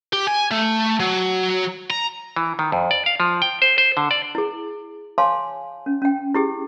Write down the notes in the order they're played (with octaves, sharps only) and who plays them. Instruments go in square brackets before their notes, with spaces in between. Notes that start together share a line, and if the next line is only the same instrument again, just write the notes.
[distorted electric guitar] G4
G#5
A3
F#3
A#5
[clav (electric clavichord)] E3
D#3
F2
D5
F5
F3
G5
C5
C5
D3
D5
[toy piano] E4 G#4
C#5 F5 G#5 A5 C6 D6
C#4
C#4 G5
E4 G4 G#4